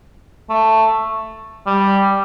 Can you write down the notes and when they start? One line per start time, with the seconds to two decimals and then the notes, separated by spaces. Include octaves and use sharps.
0.50 A3
1.67 G3